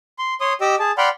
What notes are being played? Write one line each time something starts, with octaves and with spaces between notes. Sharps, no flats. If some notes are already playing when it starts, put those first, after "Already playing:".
C6
C#5 C6 D#6
G4 D#5 D6 E6
G#4 A5
D5 F#5 G5 B5 C6 F6